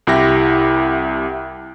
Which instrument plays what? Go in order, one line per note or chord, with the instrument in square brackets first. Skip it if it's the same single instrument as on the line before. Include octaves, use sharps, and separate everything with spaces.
[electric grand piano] C2 E4 G4 A#6